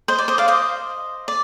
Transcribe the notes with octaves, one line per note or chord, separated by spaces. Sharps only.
C5 D#5
D5
C5 D#5
D5 F5
C5 D#5
D5